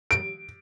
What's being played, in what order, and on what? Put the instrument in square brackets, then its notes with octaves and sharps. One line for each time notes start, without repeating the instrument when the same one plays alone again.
[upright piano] D7